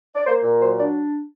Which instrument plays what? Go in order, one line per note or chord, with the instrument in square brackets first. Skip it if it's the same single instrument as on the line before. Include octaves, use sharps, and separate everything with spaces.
[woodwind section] D5
A#3 C5
A#2
F#3 C5
D4 D5